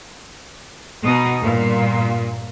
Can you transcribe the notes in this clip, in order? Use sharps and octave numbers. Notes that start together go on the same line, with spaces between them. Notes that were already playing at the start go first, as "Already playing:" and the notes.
B2 D#4
G2 A#2